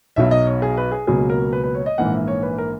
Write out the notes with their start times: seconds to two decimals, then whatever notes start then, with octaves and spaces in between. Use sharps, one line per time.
0.16 B1 B2 F#3 E5
0.31 D#5
0.47 C#5
0.62 G#4
0.77 B4
0.92 G#4
1.07 C#2 B2 F#3 A#3 G#4
1.30 A#4
1.53 B4
1.64 B4
1.75 C#5
1.86 D#5
1.98 A#1 G#2 E3 A#3 F#5
2.13 E5
2.28 C#5
2.43 B4
2.58 A#4